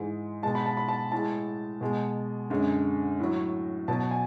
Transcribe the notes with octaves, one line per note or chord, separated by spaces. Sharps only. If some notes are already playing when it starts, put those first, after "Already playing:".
Already playing: G#2 E3 G#3
B2 G#3 A5
B5
A5
B5
A5
A2 G#3 A5
B2 G#3
F#2 D3 G#3
A2 F#3
B2 F#3 A5
G#5